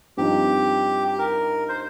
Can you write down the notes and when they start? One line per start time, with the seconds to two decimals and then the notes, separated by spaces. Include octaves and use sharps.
0.17 G2 F3 C4 D#4 G4
1.08 G4
1.18 A#4
1.69 C5